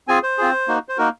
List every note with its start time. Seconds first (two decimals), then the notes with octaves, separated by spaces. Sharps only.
0.08 C4 F4 G#4 G#5
0.23 C5
0.38 C4 F4 G#4
0.68 A#3 D#4 F#4
0.89 C5
0.98 A#3 D#4 F#4 A#4